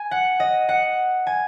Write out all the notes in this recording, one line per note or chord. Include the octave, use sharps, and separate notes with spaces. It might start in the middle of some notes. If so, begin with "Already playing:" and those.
Already playing: G#5
F#5
D#5
F#5
G#5